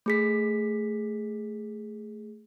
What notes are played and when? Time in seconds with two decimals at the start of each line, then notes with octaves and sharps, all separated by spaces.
0.06 A3 G#4 B6